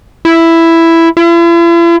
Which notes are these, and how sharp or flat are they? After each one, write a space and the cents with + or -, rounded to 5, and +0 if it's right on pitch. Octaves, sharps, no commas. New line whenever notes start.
E4 +5
E4 +45